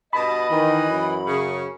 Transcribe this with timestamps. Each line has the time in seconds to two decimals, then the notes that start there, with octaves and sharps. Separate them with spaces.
0.13 G2 B2 D#5 A5 B5
0.50 D#3 E3
0.88 F#2
1.27 C#3 C#6